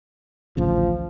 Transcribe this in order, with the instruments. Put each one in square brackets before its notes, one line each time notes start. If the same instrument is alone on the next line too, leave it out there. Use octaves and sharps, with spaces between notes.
[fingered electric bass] A1 D2 C#3 [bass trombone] F3